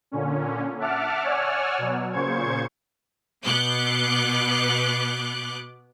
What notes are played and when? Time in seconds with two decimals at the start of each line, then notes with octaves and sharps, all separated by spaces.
0.12 A#2 D3 C#4
0.79 E5 F#5 A5 D6 F6
1.24 C#5 D5 F#5 G#5 E6 F6
1.78 B2 F#3
2.13 A#2 C#3 C5 C#6 G#6
3.44 B2 B3 D6 F#6 G6